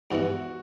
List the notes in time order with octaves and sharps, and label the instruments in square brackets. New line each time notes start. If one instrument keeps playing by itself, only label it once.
[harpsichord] G#2 E3 G3 B3 E4 [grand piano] F#4